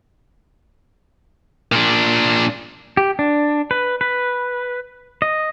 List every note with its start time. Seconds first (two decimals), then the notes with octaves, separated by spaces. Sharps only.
1.72 A#2 D4
2.97 G4
3.19 D4
3.71 B4
4.01 B4
5.22 D#5